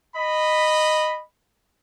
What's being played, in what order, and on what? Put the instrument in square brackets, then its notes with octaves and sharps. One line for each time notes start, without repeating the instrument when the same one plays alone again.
[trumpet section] D#5 B5